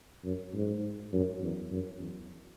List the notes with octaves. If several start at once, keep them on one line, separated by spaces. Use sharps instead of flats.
F#2
G#2
F#2
E2
F#2
E2